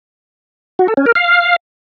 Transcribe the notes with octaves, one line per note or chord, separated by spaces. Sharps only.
F#4
A4
C#4
A#4
F5